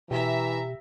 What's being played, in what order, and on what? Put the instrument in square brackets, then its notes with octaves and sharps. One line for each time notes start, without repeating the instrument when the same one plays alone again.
[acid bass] B2 [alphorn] E3 [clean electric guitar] G4 [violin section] E5 A#5